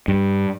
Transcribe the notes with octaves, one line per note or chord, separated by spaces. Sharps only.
G2